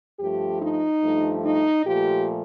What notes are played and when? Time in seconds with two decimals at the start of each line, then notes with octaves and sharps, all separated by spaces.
0.19 G2 F3 A3 G4
0.61 D#4
1.01 G2 F3 A3
1.44 D#4
1.84 A#2 F3 A3 G4